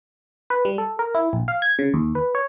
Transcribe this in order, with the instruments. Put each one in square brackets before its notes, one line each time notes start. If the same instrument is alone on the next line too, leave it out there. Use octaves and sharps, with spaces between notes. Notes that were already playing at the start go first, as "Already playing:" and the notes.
[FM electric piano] B4
G3
A4
A#4
E4
A#1
F5
G#6
C#3
D#2
B4
C#5